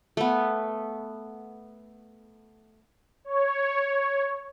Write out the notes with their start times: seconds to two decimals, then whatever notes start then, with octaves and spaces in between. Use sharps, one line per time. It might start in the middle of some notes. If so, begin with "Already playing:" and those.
0.17 A3 B3
3.25 C#5